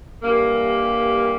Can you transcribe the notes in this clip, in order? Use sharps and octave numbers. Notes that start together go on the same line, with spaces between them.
G2 E3 G3 A#3